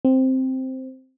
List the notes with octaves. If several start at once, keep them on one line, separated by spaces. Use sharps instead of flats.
C4